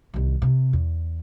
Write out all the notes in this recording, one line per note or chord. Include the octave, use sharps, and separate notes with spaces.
C2 D#3
C3
E2